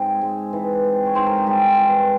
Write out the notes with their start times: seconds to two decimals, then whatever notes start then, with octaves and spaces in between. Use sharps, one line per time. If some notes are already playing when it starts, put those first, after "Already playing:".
Already playing: G#2 C4 G#4
0.22 G#3
0.53 E3
0.84 C4
1.06 C#5
1.15 G#2 C5
1.27 A#4
1.37 G#4
1.46 G3 G#3 G4
1.77 E3